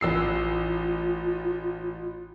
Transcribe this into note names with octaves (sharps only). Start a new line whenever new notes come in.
A1 F4 E6 C7